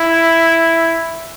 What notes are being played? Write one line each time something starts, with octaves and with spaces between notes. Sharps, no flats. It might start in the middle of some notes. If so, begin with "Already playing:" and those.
Already playing: E4